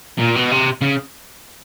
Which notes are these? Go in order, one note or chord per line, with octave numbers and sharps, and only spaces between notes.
A#2
B2
C3
C#3